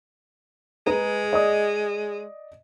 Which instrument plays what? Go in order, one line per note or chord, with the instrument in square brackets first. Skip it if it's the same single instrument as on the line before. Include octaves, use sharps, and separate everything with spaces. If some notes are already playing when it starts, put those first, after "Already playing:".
[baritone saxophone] G#3 [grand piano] G#4 B4 A#5
[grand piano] D5 D#5 D#6